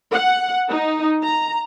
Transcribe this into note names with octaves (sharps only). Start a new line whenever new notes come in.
F#5
D#4
A#5